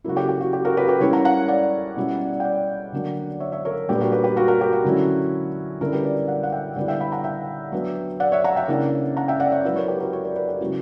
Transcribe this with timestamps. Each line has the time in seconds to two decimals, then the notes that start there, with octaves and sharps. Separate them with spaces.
0.04 C#3 F#3 A#3 E4 F#4
0.17 G4
0.29 G4
0.40 F#4
0.53 G4
0.65 F#4 A#4
0.77 G4 B4
0.89 G4 B4
1.00 E3 G3 C#4 E4 A#4 C#5
1.12 F#5 A#5
1.25 F#5 A#5
1.48 D5 F#5
1.96 B2 G3 C#4 E4
2.40 G5
2.44 D5 F#5
2.92 D3 F#3 A#3 D4
3.40 C#5 E5
3.52 C#5 E5
3.65 A#4 C#5
3.89 A#2 G3 B3 D4 G4
3.95 B4
4.01 F#4 A#4
4.12 G4 B4
4.24 G4 B4
4.36 F#4 A#4
4.48 F#4 A#4
4.61 G4
4.73 F#4
4.84 D3 F#3 C#4 E4
5.81 D3 G3 C#4 E4 A#4
5.93 G4 B4
6.04 B4 D5
6.28 D5 F#5
6.43 F#5
6.52 E5 G5
6.76 D3 G3 B3 E4 D5 F#5
6.88 E5 G5
7.01 G5 B5
7.12 F#5 A#5
7.24 E5 G5
7.72 F#3 B3 D4
8.20 D5 F#5
8.32 C#5 E5
8.44 F#5 A#5
8.56 E5 G5
8.68 C#3 E3 A#3 D4
9.17 F#5 A#5
9.28 E5 G5
9.40 D5 F#5
9.52 C#5 E5
9.65 F#3 B3 E4 B4 D5
9.76 A#4 C#5
9.88 G4 B4
10.00 F#4 A#4
10.13 A#4 C#5
10.24 B4 D5
10.36 B4 D5
10.49 G4
10.61 C#3 F#3 C#4 E4 F#4